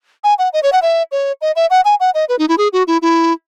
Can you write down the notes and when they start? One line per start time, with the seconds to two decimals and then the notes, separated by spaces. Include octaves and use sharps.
0.24 G#5
0.39 F#5
0.53 D#5
0.63 C#5
0.73 F#5
0.82 E5
1.12 C#5
1.41 D#5
1.56 E5
1.70 F#5
1.85 G#5
2.00 F#5
2.14 D#5
2.29 B4
2.39 D#4
2.49 E4
2.58 G#4
2.73 F#4
2.87 E4
3.02 E4